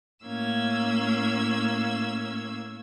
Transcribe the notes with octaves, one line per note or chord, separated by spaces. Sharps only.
A2 A#3 C#4 E6 G#6